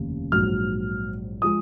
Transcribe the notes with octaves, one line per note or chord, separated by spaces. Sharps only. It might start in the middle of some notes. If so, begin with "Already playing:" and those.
Already playing: F1 D#2 C#3
A#1 G#2 F#3 F6
F3 G#3 D#6